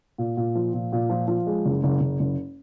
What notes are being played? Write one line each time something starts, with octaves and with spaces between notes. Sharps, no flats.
A#2
A#2
F3
A#2
A#2
F3
F3
G#3
F#1
F#1
F#1
F#1